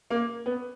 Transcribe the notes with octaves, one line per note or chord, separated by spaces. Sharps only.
A#3
B3